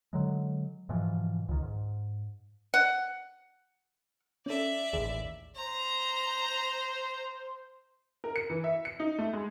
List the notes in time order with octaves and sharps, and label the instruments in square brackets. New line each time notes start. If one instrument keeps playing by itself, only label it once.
[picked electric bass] D3 F#3 G#3
G#2 B2 E3 F3
C#2 D#3
G#2
[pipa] F#5
[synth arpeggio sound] C#4 A4 [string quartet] D5 E5
[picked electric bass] A1 D#2 [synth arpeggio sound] G#4
[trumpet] C5 [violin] A#5
[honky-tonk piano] A#4
C#7
E3
E5
C#7
D#4
A3
G#3